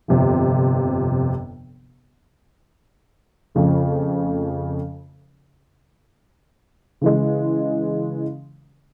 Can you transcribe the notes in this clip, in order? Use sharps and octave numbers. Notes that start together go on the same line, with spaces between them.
G1 F2 C3 F3
F2 C#3 F3 A3
C#3 E3 G#3